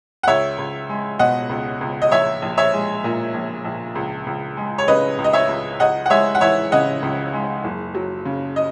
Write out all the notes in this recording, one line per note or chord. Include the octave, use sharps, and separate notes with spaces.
F#5
C#2 C#5 E5
C#2
G#3
B2 D#5 F#5
C#2
C#2
D#5
A#1 C#5 E5
A#1
C#5 E5
G#3
A#2
A#1
A#1
C#2
C#2
G#3
C#5
C#3 B4 D#5
C#2
D#5
C#5 E5
C#2
C#2 D#5 F#5
F#5
G#3 C#5 E5
F#5
E3 C#5 E5
C#3 D#5 F#5
C#2
G#3
F#1
F#3
C#3
D#5